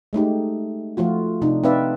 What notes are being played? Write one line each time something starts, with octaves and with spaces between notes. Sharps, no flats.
G#3 A3 D#4 G4
F3 A3 F4 F#4
C3 D4 D#4
C4 D#4 B4 D5 E5 F5